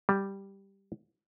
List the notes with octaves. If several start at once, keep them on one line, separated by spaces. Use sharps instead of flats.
G3